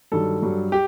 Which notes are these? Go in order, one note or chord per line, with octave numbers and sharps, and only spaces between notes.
G2 D#3 F#3 A4
G2 F#3
G4